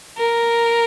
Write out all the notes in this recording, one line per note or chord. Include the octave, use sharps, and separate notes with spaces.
A#4